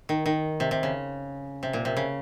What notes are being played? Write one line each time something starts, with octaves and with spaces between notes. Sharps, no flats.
D#3
D#3
C3
C3
C#3
C3
A#2
C3
C#3